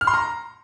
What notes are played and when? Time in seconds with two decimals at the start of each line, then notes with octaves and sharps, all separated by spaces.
0.01 F6
0.07 C6
0.14 A#5